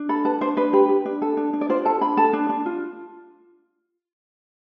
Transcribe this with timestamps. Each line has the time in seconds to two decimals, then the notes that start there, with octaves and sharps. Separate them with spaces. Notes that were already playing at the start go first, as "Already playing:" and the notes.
Already playing: D4
0.09 A4 B5
0.25 B4 A5
0.41 D4 C5
0.57 D4 B4
0.73 G4 B4
0.89 B4
1.05 D4
1.22 A4
1.37 D4
1.53 D4
1.61 D5
1.69 F4 C5
1.85 A4 A5
2.01 D4 B5
2.17 A4 A5
2.33 D4
2.49 D4
2.66 F4